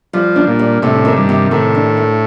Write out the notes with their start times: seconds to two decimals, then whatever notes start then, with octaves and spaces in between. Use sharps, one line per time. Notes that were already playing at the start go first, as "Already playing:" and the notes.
0.13 F3 G3
0.36 D4
0.47 A#2
0.59 G3
0.82 A2 C3
1.05 D#3
1.17 G2
1.29 C3
1.51 A2 D#3
1.75 D4
1.97 A3